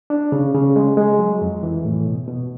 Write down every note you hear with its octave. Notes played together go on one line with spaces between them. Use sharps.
D4
C#3
C#3
G#3
G#3
F#3
F2
E3
A2
B2
B2